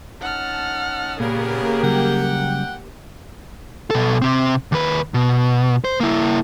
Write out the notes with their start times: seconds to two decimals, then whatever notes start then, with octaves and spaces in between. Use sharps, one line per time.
0.21 C#4 D#4 F#5 A5 F6
1.20 A#2 C#3 A#3 B3 G4 G#4 A#4
1.83 C#3 F#3 G3 F#5 G5
3.91 B2 A4
4.22 C3 C4
4.72 D#2 B4
5.14 B2
5.84 C5
6.00 A#3 E4